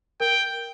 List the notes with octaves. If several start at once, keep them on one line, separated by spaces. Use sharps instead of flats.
A#4 G5